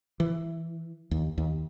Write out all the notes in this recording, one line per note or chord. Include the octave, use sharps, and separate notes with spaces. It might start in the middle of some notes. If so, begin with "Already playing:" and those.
E3
D#2
D#2